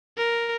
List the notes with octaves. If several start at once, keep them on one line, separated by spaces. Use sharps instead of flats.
A#4